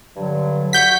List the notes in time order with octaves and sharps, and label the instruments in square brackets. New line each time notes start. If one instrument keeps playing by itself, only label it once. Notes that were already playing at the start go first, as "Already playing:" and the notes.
[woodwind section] G2 D3 F#3
[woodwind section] F#4 F#5 [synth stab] G6 B6